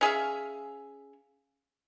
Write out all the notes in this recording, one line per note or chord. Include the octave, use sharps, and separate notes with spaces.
C#4 G#4 E5 F5